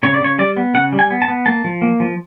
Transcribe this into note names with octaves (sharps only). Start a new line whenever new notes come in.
C#3 C#5
D5
C#3 C#5
G3 D5
B3
C#3 F#5
G3
G#5
B3
A5
B3
A#3 A5
F3
A#3
F3